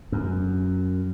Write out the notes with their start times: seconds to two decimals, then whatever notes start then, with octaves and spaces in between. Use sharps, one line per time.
0.12 F#2